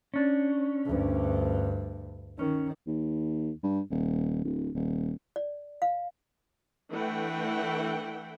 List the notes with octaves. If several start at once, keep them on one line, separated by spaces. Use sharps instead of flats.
C#4 D4
D2 G2
D#3 C#4
D#2
G2
D#1
D1
D#1
D5
F5
E3 A3 D4 E5 F#5 G5